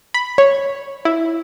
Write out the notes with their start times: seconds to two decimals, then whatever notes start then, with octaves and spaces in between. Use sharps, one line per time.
0.14 B5
0.38 C#5
1.05 E4